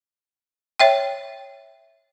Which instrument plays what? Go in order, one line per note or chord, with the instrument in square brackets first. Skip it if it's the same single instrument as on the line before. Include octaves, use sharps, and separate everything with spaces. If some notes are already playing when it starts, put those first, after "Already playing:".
[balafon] C#5 E5 G5